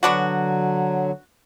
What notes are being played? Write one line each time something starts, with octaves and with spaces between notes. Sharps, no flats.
D3 F#3 B3 D4 F#4